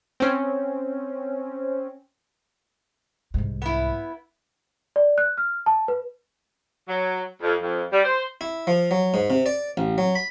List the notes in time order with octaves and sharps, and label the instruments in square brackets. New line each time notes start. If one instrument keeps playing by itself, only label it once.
[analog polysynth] C4 C#4
[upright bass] C2 G#2
[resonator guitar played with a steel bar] B3 E4
[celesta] D5
F#6
F6
A5
B4
[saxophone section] F#3
F2
F2
G3
C5
[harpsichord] E4
F3
F#3
G#2
C3
D5
A1
F#3
B5